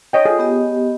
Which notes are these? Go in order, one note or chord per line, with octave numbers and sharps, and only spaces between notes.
C#5 D#5 G5
F4 G#4 A4
B3 G4 D#5